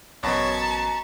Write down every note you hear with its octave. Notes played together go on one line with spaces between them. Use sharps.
A1 F#2 B2 C#5 A5 B5 C#6
A#5